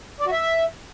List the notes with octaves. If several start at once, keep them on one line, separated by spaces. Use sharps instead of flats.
D5
F#4
E5